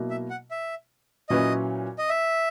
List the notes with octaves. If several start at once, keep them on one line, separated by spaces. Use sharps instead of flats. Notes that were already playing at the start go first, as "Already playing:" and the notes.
Already playing: B2 F#3 A#3 E4
E5
F#5
E5
A#2 F#3 C#4 E4 B4 D#5
D#5
E5